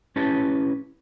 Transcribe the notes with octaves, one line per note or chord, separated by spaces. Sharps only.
C#4 E4 G4 B4 A5